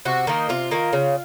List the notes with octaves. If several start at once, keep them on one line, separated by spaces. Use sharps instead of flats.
C3 F#4
D#3 A#3 D#4
C3 F4
D#3 A#3
C#3